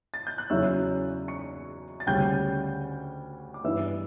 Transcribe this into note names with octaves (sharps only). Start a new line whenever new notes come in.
A6
G6
F#6
E2 C#3 F#3 C#4 E4 E5 E6
C#6 C#7
A6
D2 C#3 G3 C#4 G5 G6
D6
G2 E3 B3 E4 E5 E6